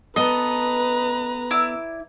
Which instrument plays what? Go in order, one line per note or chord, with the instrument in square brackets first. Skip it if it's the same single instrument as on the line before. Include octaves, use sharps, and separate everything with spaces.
[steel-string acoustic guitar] B3 A4 [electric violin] B4 A#5 [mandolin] D#5
[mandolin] E4 D5 E6